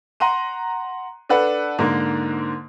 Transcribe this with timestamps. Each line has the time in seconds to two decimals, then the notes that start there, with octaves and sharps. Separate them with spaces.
0.20 F#5 A#5 C6 D#7
1.29 D4 A4 B4 F#5
1.79 G#2 D3 A#3